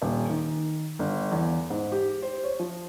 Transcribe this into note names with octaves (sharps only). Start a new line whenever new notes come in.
D#1
D#3
G1
E2
G#2
G4
C5
C#5
F3